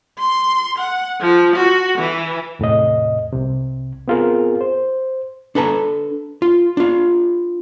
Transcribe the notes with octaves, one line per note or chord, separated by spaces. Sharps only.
C6
F#5
F3
F#4
E3
E2 A2 C3 D#5
C2 C3
B3 C4 F4 G#4 A#4
C5
D4 A4 B4 A5 A#5
F4
D4 F4